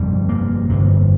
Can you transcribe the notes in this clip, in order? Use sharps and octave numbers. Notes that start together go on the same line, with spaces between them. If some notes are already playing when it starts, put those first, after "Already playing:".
Already playing: G1 F2 C3 G3
A#3
G1 F2 C3